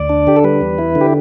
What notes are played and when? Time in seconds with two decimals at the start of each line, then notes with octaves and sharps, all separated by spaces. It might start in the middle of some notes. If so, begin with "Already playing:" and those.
Already playing: D2 D5
0.09 D4
0.27 D3 G4
0.37 A4
0.44 G3 B4
0.61 E2
0.78 E4
0.95 D3
1.01 G4